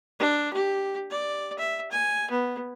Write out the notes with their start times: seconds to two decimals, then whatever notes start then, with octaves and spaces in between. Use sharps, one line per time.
0.20 D4
0.53 G4
1.10 D5
1.59 E5
1.91 G#5
2.30 B3